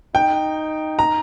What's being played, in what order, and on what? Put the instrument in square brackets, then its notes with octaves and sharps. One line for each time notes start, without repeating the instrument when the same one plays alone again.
[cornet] D#4 [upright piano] G5
[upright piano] A#5